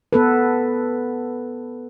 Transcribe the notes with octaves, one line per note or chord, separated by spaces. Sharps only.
B3 A4 B4